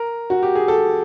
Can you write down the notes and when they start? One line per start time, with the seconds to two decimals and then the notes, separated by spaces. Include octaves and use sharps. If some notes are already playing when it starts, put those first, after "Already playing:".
Already playing: A#4
0.30 F#4
0.43 G4
0.55 G#4
0.68 A4